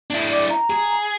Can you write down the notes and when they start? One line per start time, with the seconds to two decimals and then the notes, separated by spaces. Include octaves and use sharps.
0.10 D4 E4
0.31 D5
0.49 A#5
0.70 G#4